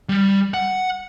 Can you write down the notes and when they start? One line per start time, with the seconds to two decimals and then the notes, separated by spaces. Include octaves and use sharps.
0.09 G3
0.54 F#5